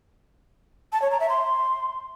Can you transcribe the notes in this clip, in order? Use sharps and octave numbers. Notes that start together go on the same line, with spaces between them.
A5
C#5
A#5
E5
C6